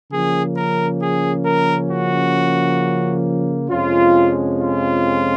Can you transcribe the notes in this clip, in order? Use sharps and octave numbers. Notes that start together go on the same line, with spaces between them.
C#3 F3 A#3 C#4 G#4
A#4
G#4
A#4
F#4
F2 C3 F3 G#3 C#4 F4
F4